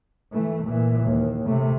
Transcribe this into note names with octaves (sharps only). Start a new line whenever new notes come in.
E3 A3
A#2 E3
D#2
C3 A3